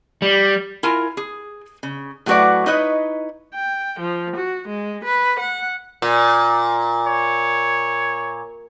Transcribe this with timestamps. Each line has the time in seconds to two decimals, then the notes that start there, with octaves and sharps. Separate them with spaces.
0.22 G3
0.83 E4 F4 A#4 G#5 A#5
1.17 G#4
1.83 C#3
2.26 A2 F#3 A3 F#4 B4 D5
2.66 D#4 E4 B4 C#5 D#5
3.54 G5
4.00 F3
4.36 F#4
4.68 G#3
5.04 B4
5.39 F#5
6.02 A#2
7.06 C#5